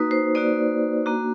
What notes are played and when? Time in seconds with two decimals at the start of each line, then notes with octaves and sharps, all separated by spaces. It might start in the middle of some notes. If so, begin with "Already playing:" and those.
Already playing: A#3 D#4 F#4 B4
0.11 C5
0.35 A#3 D#4 F#4 D5
1.06 A#3 D4 F#4